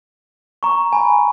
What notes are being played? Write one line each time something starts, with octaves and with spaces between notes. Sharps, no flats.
A#5 C#6
G#5 B5